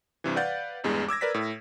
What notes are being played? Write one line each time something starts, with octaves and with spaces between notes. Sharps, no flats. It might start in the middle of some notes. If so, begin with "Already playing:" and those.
G2 C3 E3
B4 D5 F5 F#5 G6 A6
A1 E2 G2 G#3
D6 E6 G#6 A#6
A#4 B4 D5 A#6 B6
A2